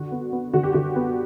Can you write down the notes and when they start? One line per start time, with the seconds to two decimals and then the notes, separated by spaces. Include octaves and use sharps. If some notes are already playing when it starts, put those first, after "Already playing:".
Already playing: D3 F#4
0.12 B3
0.32 B3
0.53 D3 F#4
0.63 G4
0.73 D3 F#4
0.96 B3